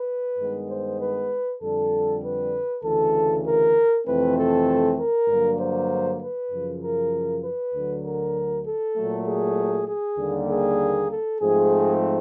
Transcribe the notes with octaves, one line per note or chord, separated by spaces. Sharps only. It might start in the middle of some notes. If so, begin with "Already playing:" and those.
Already playing: B4
G2 D#3 G#3 B3
C5
B4
F2 D3 G3 A4
B4
D2 C#3 E3 A4
A#4
F2 C3 E3 A3 C4 B4
A4
A#4
G2 D3 F#3 A#3
C5
B4
F#2 C#3 F3
A#4
B4
D2 D3 F#3
A#4
A4
A#2 F#3 A3
G#4
G#4
D#2 D3 G3 A#3
G#4
A4
G#2 F3 A3 C4 G#4